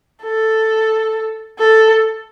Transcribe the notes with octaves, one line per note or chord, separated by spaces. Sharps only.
A4
A4